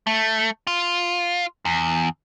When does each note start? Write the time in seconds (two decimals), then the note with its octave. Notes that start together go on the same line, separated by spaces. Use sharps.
0.07 A3
0.67 F4
1.65 E2